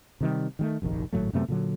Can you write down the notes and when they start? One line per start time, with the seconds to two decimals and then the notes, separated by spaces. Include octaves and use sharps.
0.21 C3 D#3 G3
0.59 D#3 G3 A3
0.82 F1 A#1 D#2 D#3
1.13 G#1 A2 F#3 A3
1.33 F#2 C3 A3 B3
1.48 A#2 D3 F#3